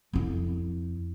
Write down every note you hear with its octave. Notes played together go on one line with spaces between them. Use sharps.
F2 E4